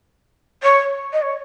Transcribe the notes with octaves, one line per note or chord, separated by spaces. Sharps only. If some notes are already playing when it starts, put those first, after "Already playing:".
C#5
D#5
C#5